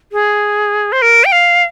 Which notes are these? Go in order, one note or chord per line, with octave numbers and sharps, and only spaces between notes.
G#4
C5
A#4
G5
F5